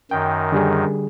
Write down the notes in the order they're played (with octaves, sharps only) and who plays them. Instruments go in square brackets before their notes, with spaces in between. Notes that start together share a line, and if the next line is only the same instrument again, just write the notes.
[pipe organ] F#2 D#3 [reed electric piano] G5
[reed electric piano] D3 G3 G#4